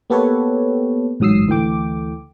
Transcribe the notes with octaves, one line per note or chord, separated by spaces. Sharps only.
A#3 B3 G4 A4 B4 C#5
A1 G#2 F#3 D#6 E6 C7
D2 E3 A3 G5 D6